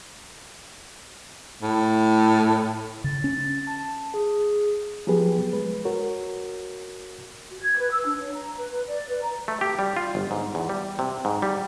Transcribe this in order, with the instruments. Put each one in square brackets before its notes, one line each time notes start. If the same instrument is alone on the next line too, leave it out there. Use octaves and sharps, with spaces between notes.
[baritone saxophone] A2
[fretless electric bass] C#3 [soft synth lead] A6
[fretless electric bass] C#4
[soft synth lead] A5
G#4
[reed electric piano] F3 F#3 B3 G4 G#4 B4
G#3 B4
F#4 A#4 C#5
[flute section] F#4
G#6
B4
E6
D4
C#5
A#5
B4
B4
D5
B4
A#5
[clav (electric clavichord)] A3
G4
G3
F4
G1
G#2
E2
G3
C3
G#2
G3